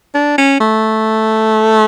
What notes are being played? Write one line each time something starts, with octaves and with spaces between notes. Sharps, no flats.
D4
C#4
A3